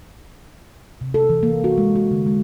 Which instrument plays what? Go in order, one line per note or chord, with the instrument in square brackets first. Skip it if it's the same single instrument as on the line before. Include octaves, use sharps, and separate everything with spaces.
[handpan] C3
A4
E3
A#3
F#4
G#3
F#4
D3
G#3